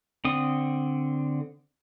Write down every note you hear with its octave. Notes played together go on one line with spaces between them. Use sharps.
D3 C4 D#6